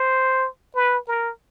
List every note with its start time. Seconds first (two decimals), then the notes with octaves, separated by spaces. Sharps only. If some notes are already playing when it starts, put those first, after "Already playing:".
Already playing: C5
0.76 B4
1.08 A#4